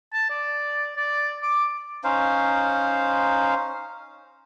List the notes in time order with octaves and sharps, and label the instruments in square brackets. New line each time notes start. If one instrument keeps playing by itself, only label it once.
[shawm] A5
D5
D5
D6
[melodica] C#4 D#4 C5 F5